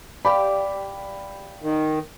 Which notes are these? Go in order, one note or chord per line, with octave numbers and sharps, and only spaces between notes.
G3 G4 D5 F5 G5 B5
D#3